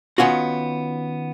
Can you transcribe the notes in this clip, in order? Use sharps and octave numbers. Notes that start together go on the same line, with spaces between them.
D#3 B3 C#4 F4 F#4